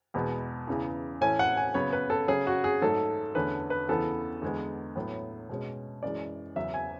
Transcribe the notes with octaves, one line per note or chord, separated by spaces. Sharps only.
E2 B2 G#3 B3
E2 C#3 E3
A2 E3 A3 C#4 G#5
F#5
G#5
C#3 F#3 B3 C#5
B4
A4
C#3 F#3 C#4 G#4
F#4
G#4
G#2 F#3 A3 A4
E2 D3 A3 C#4 B4
B4
E2 C#3 E3 B3 A4
E2 D3 G#3 B3
A2 F#3 B3
B2 G#3 C#4
F#2 E3 G#3 D5
E2 C#3 F#3 C#4 E5
G#5